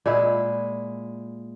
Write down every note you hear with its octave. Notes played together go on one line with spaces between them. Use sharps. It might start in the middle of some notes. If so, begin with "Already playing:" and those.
A#2 G#3 E4